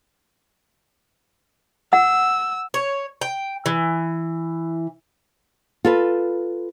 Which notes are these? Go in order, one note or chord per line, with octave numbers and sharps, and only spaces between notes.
F#5 E6
C#5
G5
E3
F4 A4 B4